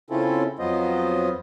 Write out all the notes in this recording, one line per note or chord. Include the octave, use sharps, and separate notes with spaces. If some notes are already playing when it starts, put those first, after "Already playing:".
C#3 C4 C#4 E4 F4 A4
F2 F#3 B3 F4 C5 D#5